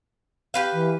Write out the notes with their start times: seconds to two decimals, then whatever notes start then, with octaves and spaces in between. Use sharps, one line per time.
0.54 G4 B4 F5
0.73 E3